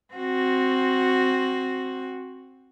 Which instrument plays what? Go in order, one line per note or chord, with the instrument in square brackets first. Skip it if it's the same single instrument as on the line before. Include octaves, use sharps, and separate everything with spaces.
[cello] C4 F#4